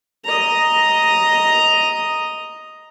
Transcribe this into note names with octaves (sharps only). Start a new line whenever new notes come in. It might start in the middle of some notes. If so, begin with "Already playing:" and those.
D#5 A#5